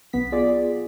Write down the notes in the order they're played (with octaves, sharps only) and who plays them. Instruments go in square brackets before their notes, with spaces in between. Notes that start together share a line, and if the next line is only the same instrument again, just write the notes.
[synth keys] B1 B3 B6
F4 G#4 D5